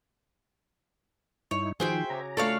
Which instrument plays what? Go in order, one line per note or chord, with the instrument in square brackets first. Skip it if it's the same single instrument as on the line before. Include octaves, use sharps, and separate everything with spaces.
[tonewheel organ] G2 D#4 E4 [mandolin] C#5
[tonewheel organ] D#3 F3 [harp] F#4 [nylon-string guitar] G#4 [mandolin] C5 E5 G5
[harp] C#3 G#5 D6 [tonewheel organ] A#5
[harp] A3 F4 [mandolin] D4 C#5 F5 [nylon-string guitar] A4